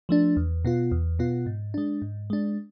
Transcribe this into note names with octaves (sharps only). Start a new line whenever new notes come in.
F3 A3 D4
E2
B2 B3 F4
E2
B2 B3 F4
G#2
G#3 D4
G#2
G#3 D4